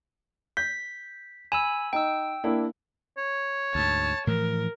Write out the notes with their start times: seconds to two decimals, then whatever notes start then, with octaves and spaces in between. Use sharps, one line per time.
0.57 G6 B6
1.52 G#5 B5 E6 E7
1.93 D#4 G5 E6
2.44 A#3 D4 E4
3.18 C#5
3.75 D2 G#2 A5
4.27 A2 E3 F3 A#4